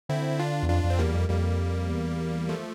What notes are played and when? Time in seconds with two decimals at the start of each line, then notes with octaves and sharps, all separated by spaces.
0.09 D3 C4 E4
0.39 D4 F4
0.63 E2
0.69 F2 D4 F4
0.84 F2
0.90 C4
0.99 E2 G3 A#3
1.14 F2
1.29 F2 G3 A#3
1.89 E2
2.49 F3 A3